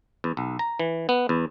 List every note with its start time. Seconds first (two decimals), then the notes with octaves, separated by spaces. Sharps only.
0.24 E2
0.37 B1
0.59 A#5
0.79 E3
1.09 B3
1.29 E2